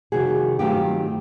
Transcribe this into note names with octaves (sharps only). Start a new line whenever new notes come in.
F2 C3 D#3 G3 F#4 G#4
G2 D#3 F#3 A3 C4 F4 G4